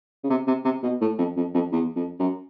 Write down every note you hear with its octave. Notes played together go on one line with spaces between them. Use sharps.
C#3
C3
C3
C3
B2
A2
F2
F2
F2
E2
F2
F#2